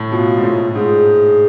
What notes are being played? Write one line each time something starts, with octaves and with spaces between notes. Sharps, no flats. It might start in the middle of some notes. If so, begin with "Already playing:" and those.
Already playing: A2
B2 F4
G#2
A2
G#2 G#4